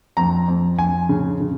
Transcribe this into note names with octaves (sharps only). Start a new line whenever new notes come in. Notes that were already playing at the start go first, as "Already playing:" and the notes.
F2 A#5
F2
F2 G#5
C#3
C#3